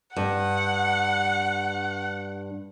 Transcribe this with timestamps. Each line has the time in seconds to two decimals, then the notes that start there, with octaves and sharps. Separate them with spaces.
0.16 G2 F#5